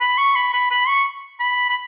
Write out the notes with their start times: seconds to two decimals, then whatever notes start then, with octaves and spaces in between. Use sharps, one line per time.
0.01 B5
0.18 C#6
0.36 B5
0.53 B5
0.71 B5
0.88 C#6
1.40 B5
1.70 B5